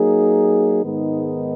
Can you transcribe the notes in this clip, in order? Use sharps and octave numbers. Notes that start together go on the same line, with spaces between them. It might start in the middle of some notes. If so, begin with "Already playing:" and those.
Already playing: F#3 A#3 D#4 G#4
G#2 D#3 G#3 B3 D#4